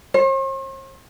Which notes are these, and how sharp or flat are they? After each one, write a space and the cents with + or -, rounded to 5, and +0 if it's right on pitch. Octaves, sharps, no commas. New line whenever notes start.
C5 +45